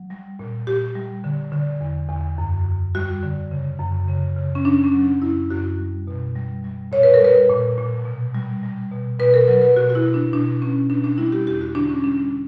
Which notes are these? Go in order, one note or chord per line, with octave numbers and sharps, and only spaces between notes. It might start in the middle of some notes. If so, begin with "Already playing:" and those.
Already playing: F#3
G3
A#2
A#2 G4
G3
D3
D3
E2
E2
F#2
F#2
G3 F#4
D3
C#3
F#2
C#3
C#3
C#4
C#3 D4
C#4
F#3
D4
F#2 E4
F#2 F#4
G3
B2
G3
G3
A#2 C#5
B4
A#4
G3 B4
A#2
A#2
B2
G3
G3
B2
B2 B4
A#4
F#3 B4
B4
B2 F#4
F#4
E4
B2
D4
B2 D4
B2 C#4
B2 D4
D4
G3 E4
G4
E2 G4
F#4
D3 D4
C#4
G3 D4